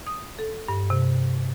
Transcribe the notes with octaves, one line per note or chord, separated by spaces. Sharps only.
D#6
A4
G2
C3